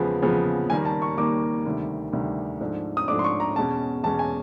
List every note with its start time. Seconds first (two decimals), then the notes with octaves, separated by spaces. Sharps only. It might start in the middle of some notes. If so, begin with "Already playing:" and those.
Already playing: E2 C#3 F3 G#3 B3
0.22 E2 C#3 F3 G#3 B3
0.70 D#2 D#3 G3 A#3 G#5
0.85 A5
1.02 C#6
1.17 D#2 D#3 G3 A#3 D6
1.65 D2 C3 D#3 G3
2.13 D2 C3 D#3 G3
2.61 G#2 F3 A3 D4
2.97 D#6
3.08 G#2 F3 A3 D4 D6
3.19 C6
3.24 C#6
3.40 A#5
3.56 E2 B2 G#3 C#4 A5
4.03 E2 B2 G#3 C#4 A5
4.19 G#5